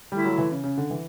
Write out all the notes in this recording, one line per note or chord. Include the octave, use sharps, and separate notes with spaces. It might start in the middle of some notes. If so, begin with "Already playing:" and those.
D3 G3 A3 E4
F#3
E3
C#3
C#3
D3
E3